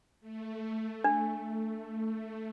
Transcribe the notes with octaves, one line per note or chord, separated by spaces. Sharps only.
A3
D4